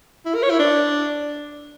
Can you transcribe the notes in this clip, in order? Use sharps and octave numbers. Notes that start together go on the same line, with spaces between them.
E4
A#4
C#5
E4
D4